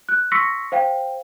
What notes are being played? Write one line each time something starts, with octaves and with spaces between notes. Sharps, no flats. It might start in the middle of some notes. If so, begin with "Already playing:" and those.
F#6
C6 C#6 E6 A#6 B6 C#7
C5 F5 G5